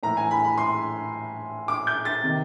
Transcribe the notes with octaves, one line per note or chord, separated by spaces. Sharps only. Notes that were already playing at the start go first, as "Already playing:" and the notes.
A2 E3 A#5
G#5
B5
B5
C6
D6
G6
A6
C3 D#3